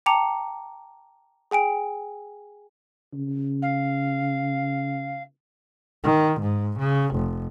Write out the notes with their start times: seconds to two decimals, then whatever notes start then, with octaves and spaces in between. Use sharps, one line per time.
0.06 G5 A5 A#5 D6 C#7 F7
1.51 G#4 G5 G#5 D7
3.13 C#3
3.62 F5
6.04 D#3
6.41 G#2
6.79 C#3
7.15 F1